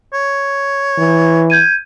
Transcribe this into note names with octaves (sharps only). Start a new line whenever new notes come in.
C#5
E3
G6 G#6 D#7